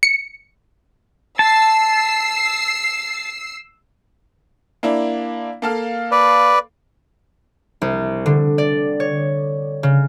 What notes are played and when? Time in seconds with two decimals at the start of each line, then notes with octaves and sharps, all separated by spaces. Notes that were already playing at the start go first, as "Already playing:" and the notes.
0.03 C#7
1.39 A5 E6 C7
4.83 A#3 D4 E4
5.62 A#3 A4 F5
6.12 B4 D5
7.82 C2
8.26 D3
8.58 D5
9.00 C#5
9.83 C#3